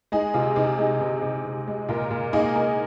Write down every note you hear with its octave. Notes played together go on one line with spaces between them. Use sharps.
G#3 D#4 G#4
C3 F4
C3 D#4 G#4
G#3 D#4 G#4
C3
C3
C3
G#3
A#2 F4 A#4
A#2
A#3 D#4 G#4
A#3